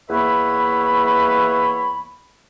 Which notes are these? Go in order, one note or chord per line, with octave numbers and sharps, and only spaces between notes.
E2 A#3 B4 C#5 E5 B5